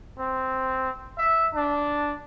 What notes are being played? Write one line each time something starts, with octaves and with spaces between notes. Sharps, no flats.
C4
E5
D4